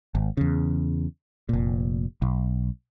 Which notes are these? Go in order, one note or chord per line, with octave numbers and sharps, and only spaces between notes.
G#1
E2 C#3
F1 A#2
B1